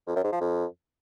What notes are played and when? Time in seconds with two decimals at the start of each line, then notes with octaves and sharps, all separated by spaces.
0.07 F2
0.16 F#2
0.24 G#2
0.32 F3
0.41 F2